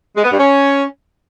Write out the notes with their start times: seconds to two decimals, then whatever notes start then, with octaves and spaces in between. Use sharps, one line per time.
0.16 G#3
0.24 B3
0.32 G2
0.39 C#4